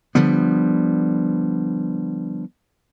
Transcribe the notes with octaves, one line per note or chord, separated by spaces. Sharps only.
D3 F3 G3 B3